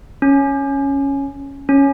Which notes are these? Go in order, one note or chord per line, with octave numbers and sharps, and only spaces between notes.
C#4
C#4